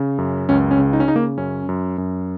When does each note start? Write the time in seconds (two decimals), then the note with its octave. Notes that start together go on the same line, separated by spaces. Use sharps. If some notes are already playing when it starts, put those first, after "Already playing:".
Already playing: C#3
0.18 F#2
0.49 C#2 C#4
0.71 C#4
0.79 C#3
0.93 D#4
1.00 C#4
1.08 C#3 D#4
1.16 A#3
1.38 F#2 C#4
1.69 F#2
1.98 F#2